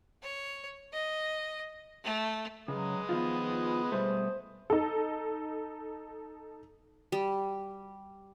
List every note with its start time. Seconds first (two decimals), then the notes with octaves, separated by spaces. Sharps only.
0.22 C#5
0.93 D#5
2.04 A3
2.68 C#3 F#3 G#3 B4 D#6
3.09 D#3 F3 B3 F4
3.92 B2 G3 A3 C5
4.70 D#4 A4
7.12 G3